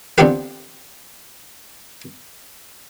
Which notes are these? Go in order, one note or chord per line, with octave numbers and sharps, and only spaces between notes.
D3 B3 C4 F4 G4 B4